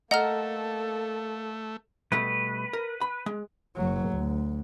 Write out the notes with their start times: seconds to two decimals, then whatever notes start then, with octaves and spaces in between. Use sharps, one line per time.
0.11 A3 A#3 A4 D#5 F#5 A#5 F6
2.12 B2 G3 A3 B4
2.73 A#4
3.01 B5
3.26 G#3
3.76 F#1 F#3
4.10 D2